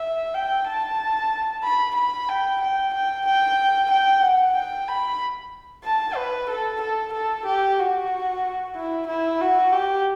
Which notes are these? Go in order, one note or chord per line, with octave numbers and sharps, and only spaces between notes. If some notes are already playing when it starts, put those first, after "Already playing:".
Already playing: E5
G5
A5
B5
B5
G5
G5
G5
G5
G5
F#5
G5
B5
A5
B4
A4
A4
A4
G4
F#4
E4
E4
F#4
G4